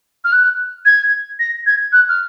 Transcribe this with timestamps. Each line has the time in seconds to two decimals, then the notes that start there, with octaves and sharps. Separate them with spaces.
0.25 F6
0.32 F#6
0.85 G#6
1.39 A#6
1.66 G#6
1.93 F#6
2.09 F6